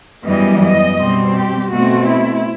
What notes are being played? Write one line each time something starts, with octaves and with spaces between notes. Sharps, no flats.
F#2 E3 G3 B3 D#5
D#5
B2 G3 C4
G4
B2 A3 C4 F#4
E4